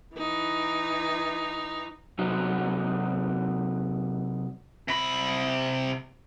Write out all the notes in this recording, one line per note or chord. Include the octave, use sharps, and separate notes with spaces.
E3 D#4
C3 F#3 D#4 F#4
C3 B5